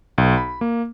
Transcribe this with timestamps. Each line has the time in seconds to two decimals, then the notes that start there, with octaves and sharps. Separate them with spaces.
0.18 B1
0.37 B5
0.61 A#3